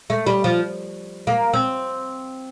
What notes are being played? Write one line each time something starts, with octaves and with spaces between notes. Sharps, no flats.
A3
G3
F3
A#3
C4